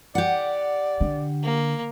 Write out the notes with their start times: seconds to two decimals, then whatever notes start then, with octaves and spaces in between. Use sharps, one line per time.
0.15 G4 D5 F#5
1.00 D3
1.43 A#3